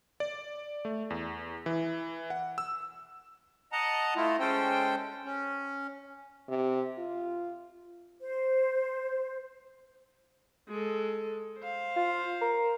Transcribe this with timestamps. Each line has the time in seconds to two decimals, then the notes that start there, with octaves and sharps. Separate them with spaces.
0.20 D5
0.85 A3
1.10 E2
1.66 E3
2.30 F#5
2.58 E6
3.72 D#5 F#5 A5 A#5
4.16 A3 E4 F4
4.40 G#3 C#4 A4 C5 G5
5.25 C#4
6.48 C3
6.98 F4
8.20 C5
10.68 G#3 A4
11.60 C5 F5
11.96 F4
12.41 A#4